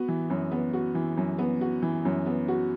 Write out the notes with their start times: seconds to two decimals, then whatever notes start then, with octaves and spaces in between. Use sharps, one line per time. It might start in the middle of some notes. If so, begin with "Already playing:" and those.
Already playing: B3 F#4
0.08 E3
0.30 F#2
0.51 B3
0.73 F#4
0.95 E3
1.17 F#2
1.38 B3
1.61 F#4
1.82 E3
2.05 F#2
2.26 B3
2.48 F#4